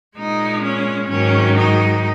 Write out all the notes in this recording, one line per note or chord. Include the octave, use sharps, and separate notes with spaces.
A#2 G#3 D#4
C#4
G#2 D#3 F#3 C#4
D#4